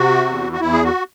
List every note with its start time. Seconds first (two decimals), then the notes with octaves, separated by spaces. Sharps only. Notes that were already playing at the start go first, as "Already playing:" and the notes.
Already playing: C3 F#4
0.27 E2
0.53 F#4
0.61 E2 E4
0.72 G#4
0.83 F#4